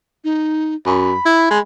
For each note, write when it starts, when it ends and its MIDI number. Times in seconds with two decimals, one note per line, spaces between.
0.24 0.75 63
0.86 1.14 42
0.86 1.61 83
1.25 1.47 64
1.50 1.59 56